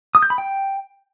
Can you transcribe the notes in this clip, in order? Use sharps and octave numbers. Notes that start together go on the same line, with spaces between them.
D#6
G6
B5
G5